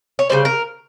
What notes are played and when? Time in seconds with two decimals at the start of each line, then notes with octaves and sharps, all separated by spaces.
0.19 C#5
0.30 C#3 E3 G3 C5
0.45 A#4